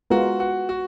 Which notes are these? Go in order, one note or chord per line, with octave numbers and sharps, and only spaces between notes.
G#3 B3 F4 F#4 A#4
F#4
F#4